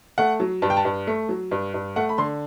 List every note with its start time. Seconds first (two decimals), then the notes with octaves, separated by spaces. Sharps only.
0.18 A3 F#5
0.40 F#3
0.62 G2 A5
0.70 G5
0.77 A5
0.85 G2
1.07 A3
1.29 F#3
1.51 G2
1.74 G2
1.96 A3 F#5
2.09 B5
2.18 D3 C6